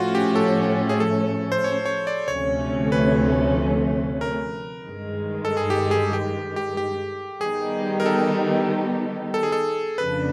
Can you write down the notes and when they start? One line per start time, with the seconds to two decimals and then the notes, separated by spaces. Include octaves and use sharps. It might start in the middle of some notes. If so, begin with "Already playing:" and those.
Already playing: A2 F3 A3 C#4 F4 F#4
0.15 G4
0.36 A4
0.89 G#4
1.00 A4
1.52 C5
1.64 C#5
1.86 C#5
2.07 D5
2.28 D2 C3 F3 A3 C#4 C#5
2.92 B4
4.21 A#4
4.85 G2 D#3 G#3
5.45 A4
5.57 G#4
5.70 G4
5.91 G#4
6.13 G4
6.56 G4
6.77 G4
7.41 D#3 G3 B3 D#4 G4 G#4
8.00 A#4
8.06 A4
9.34 A4
9.43 G#4
9.52 A4
9.98 F2 C#3 F3 A#3 D4 B4